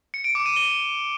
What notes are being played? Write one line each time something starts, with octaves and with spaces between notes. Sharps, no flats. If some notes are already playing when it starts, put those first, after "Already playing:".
C#7
D7
D6
D#7
G7